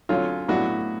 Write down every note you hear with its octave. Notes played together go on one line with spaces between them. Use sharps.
D3 F#3 C#4 F4
A2 F#3 B3 D4 F#4